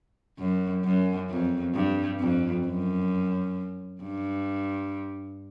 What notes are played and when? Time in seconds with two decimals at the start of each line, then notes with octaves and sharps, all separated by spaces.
0.39 F#2
0.84 F#2
1.29 F2
1.74 G2
2.20 F2
2.66 F#2
4.02 G2